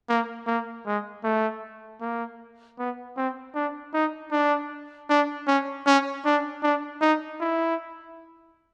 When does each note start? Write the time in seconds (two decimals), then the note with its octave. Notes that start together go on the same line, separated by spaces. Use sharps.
0.09 A#3
0.47 A#3
0.86 G#3
1.24 A3
2.01 A#3
2.79 B3
3.17 C4
3.55 D4
3.94 D#4
4.32 D4
5.10 D4
5.47 C#4
5.87 C#4
6.25 D4
6.63 D4
7.01 D#4
7.40 E4